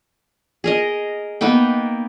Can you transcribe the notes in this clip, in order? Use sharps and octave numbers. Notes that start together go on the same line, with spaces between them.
G#4 A#4 D#5
A#3 B3 D#4 G5